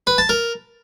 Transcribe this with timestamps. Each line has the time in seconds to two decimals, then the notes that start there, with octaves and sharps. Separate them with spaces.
0.07 B4
0.18 A5
0.29 A#4